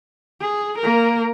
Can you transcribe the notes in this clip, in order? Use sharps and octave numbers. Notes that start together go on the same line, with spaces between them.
G#4
A#3 A#4